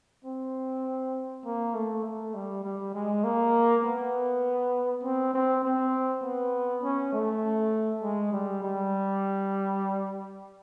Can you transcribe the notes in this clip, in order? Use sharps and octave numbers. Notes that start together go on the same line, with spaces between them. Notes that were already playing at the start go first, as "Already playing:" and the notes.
C4
A#3
A3
A3
G3
G3
G#3
A#3
B3
C4
C4
C4
B3
C#4
A3
G#3
G3
G3